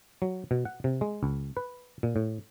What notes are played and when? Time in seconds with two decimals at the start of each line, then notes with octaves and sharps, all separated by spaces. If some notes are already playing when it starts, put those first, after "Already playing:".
0.22 F#3
0.51 B2
0.65 F#5
0.84 C3
1.01 G#3
1.23 C#2
1.57 B4
2.03 A#2
2.16 A2